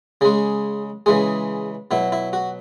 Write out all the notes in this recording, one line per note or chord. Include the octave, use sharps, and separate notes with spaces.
C#3 G#3 G#4
C#3 E3 G#3 G#4
B2 F#3 E4
E4
F#4